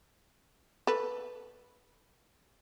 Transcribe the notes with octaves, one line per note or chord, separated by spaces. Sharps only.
A4 B4